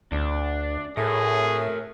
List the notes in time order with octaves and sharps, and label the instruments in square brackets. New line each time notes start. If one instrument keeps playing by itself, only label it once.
[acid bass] D2 [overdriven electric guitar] D4
[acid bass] A2 [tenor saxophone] A3 [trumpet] G#4 [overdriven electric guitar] A#4 C#5